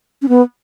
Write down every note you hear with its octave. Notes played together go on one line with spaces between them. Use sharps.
C#4
B3